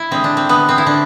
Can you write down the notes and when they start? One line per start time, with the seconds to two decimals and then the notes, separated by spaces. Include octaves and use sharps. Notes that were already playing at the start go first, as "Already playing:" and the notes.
Already playing: E4
0.11 D3 G#3 C4
0.24 D4
0.37 C4
0.49 D3 G#3 B3
0.69 C4
0.78 E4
0.86 D3 D4